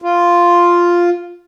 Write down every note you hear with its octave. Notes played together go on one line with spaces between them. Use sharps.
F4